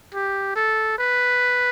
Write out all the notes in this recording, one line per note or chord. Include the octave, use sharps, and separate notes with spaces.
G4
A4
B4